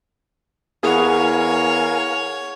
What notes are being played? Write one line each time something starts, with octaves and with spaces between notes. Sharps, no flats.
E2 G#4 A#4 B4 C#5 F5 F#5 G#5